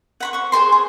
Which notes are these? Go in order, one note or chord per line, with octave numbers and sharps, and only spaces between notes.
F#5 B5 C#6
C5 C#6
G#4 A4 C5 C6
G#4